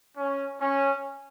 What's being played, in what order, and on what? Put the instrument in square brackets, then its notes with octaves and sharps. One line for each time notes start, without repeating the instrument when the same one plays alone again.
[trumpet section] C#4
C#4